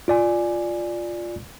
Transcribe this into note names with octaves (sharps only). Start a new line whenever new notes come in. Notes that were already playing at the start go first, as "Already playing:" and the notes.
F4 D5 G#5